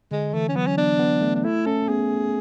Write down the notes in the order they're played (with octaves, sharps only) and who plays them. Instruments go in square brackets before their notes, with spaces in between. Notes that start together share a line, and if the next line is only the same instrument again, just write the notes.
[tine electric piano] D3 [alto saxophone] G#3
[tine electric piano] E3 [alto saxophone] A3
[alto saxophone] C#4
[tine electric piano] F#3 [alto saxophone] B3
[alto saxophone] C#4
[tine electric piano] B3 [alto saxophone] D4
[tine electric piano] B3
A3
[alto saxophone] D4
[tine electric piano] A3 [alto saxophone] E4
[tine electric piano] C#4 [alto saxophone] A4
[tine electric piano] B3 [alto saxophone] G#4